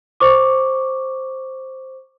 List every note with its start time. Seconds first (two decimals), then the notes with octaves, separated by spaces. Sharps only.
0.20 C5 C#6 D6